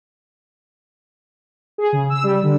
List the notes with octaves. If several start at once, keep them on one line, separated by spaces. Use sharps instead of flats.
G#4
C#3
E6
G3
D3